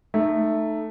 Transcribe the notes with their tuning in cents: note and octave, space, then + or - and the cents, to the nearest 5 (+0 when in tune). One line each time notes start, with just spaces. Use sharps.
A3 +0 D#4 -20